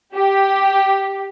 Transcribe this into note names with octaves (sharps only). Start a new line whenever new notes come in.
G4